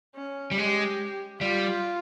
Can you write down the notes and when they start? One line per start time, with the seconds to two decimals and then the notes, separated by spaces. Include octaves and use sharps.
0.16 C#4
0.51 G3
0.57 G#3 G4
1.41 G3 F4